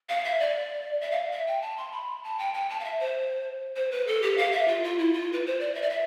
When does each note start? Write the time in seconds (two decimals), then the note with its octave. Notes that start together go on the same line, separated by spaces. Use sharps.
0.09 F5
0.24 E5
0.40 D5
1.01 E5
1.11 F5
1.32 E5
1.47 G5
1.62 A5
1.77 C6
1.92 B5
2.23 A5
2.39 G5
2.54 G5
2.69 A5
2.80 F5
2.84 E5
3.00 C5
3.76 C5
3.91 B4
4.07 A4
4.22 G4
4.37 F5
4.52 E5
4.68 F4
4.83 F4
4.98 E4
5.13 F4
5.33 B4
5.46 C5
5.60 D5
5.75 E5
5.82 D5
5.90 E5